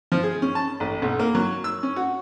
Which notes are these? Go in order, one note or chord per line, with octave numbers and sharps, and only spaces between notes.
F3
G#4
C#4
A5
A1
B1
A#3
F#3
E6
C#4
F#4